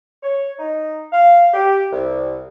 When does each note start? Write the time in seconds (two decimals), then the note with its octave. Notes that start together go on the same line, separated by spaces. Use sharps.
0.23 C#5
0.59 D#4
1.13 F5
1.54 G4
1.92 C2